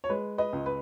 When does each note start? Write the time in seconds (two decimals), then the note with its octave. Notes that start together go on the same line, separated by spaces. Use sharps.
0.04 C#5
0.09 G#3 B4
0.38 B4 D#5
0.53 C#2
0.66 B4